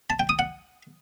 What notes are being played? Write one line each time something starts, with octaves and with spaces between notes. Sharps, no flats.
A5
G5
D#6
F#5